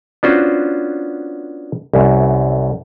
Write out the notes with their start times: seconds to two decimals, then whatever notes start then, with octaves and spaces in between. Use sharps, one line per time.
0.23 B3 C#4 D4 F4 F#4 C5
1.94 C2 F#2